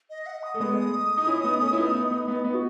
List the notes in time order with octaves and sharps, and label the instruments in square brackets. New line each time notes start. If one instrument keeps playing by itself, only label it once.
[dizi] D#5
F#5
D#6
[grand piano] A3
[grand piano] G#3 B3 [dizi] D#6
[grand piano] D#4
C#4 E4
B3 D#4
A3 C#4
E4
B3 D#4
B3 D#4
B3 D#4
B3 D#4
B3 D#4
F#4